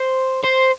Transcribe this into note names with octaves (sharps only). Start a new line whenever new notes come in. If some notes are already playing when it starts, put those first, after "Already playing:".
Already playing: C5
C5